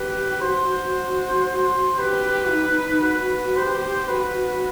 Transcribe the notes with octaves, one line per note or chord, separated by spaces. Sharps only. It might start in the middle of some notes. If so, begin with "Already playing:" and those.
Already playing: G4 B4
F#4 C5
C5
G4 B4
D#4
F#4 B4
G4 C5
F#4 B4